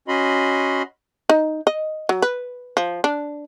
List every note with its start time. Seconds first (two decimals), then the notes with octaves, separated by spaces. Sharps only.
0.08 C#4 F#4 D#5 B5 C6
1.29 D#4
1.67 D#5
2.09 F#3
2.22 B4
2.77 F3
3.04 D4